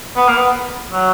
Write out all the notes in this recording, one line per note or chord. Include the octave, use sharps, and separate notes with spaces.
B3
A#3
B3
F#3